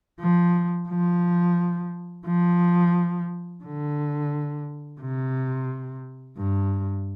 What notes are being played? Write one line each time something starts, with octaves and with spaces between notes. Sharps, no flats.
F3
F3
F3
D3
C3
G2